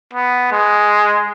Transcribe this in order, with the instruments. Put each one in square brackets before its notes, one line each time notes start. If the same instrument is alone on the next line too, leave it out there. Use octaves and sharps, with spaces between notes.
[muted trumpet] B3
G#3